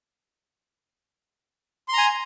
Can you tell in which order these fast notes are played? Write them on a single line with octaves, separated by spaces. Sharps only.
C6 A#5 G#5